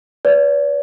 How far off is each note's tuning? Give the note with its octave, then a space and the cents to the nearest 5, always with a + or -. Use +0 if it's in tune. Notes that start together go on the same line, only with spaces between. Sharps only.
B4 +5 D5 -45